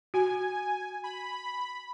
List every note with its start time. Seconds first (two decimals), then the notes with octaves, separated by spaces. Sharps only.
0.14 F#4 G#5
1.04 B5